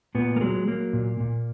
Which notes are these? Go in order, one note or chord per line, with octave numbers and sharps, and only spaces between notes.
A#2 B3
A#3
F#3 G#3
F#3 A#3
A#2
A#2